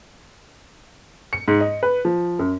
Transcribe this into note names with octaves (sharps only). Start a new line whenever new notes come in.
C#7
G#2
D#5
B4
F3
F#2